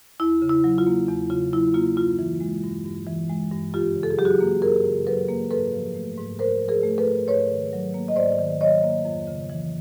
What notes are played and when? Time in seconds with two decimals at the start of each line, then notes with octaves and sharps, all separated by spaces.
0.20 E2 E4
0.42 C#3
0.49 E4
0.64 F#3
0.78 F4
0.87 A#3
1.09 E2
1.30 C#3 F4
1.53 F#3 E4
1.74 A#3 F4
1.96 G2 F4
2.19 E3
2.40 G#3
2.63 G2
2.85 G2
3.07 E3
3.29 G#3
3.52 G2
3.74 F#2 F4 G4
3.96 C#3
4.03 A4
4.11 G#4
4.18 F#3 G4
4.25 F#4 G#4
4.41 A#3
4.62 F#2 G#4 A#4
4.85 C#3
5.07 F#3 A4 B4
5.29 A#3
5.51 G#2 A4 B4
5.73 F3
5.95 A3
6.17 G#2
6.39 G#2 A#4 C5
6.62 F3
6.68 G#4 A#4
6.83 A3
6.98 A4 B4
7.05 G#2
7.27 G#2 B4 C#5
7.50 D#3
7.73 F#3
7.94 A#3
8.08 D#5
8.16 G#2 C5 D5
8.39 D#3
8.60 F#3 C#5 D#5
8.83 A#3
9.05 F2
9.27 C#3
9.50 E3